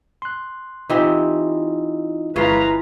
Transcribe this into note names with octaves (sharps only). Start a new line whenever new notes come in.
C6 F#6
E3 C4 D#4 F4 G4 D#5
G1 G#3 C#4 E4 F4 B4 A#5 C7